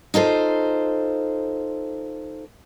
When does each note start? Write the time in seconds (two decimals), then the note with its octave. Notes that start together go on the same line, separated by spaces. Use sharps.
0.14 D#4 F4 A4 C5